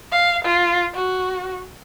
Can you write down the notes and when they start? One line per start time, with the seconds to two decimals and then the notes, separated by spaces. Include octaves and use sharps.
0.12 F5
0.45 F4
0.95 F#4